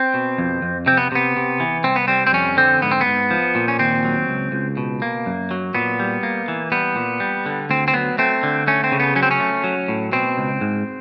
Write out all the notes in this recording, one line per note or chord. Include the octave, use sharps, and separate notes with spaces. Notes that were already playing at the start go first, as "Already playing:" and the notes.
Already playing: C4
B2
F2
F2
C3 C4
B3
C3 B3
C3
E3
C2 C4
B3
G3 C4
C4
F2 C#4
D3 C4
G#2 B3
C4
B3
G#2
F3
A#2
C#4
D#2 C4
F#3
C#2
C#2
B2
A#3
F#2
F#3
A#2 B3
G3
A#3
E3
G3 B3
A#2
G3
D3
D2 C4
C4
F#3 B3
A3 C4
D3
A3 C#4
C4
C#3
B3
F#3 C#4
C4
C#4
A3
F#3
A2
B2 C4
C#2
G#2